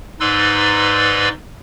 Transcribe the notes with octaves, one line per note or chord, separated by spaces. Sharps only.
G#2 D#4 B4 D5 C6 E6